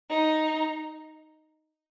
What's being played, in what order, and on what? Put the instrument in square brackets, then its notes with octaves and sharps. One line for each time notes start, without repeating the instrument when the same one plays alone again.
[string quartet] D#4